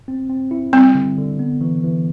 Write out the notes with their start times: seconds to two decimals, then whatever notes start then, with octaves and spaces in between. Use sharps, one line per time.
0.08 C4
0.29 C4
0.51 E4
0.73 G3 C4
0.95 D3
1.18 D3
1.39 B3
1.61 E3
1.84 E3